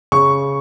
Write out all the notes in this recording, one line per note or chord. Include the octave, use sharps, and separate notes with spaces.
C#3 C#6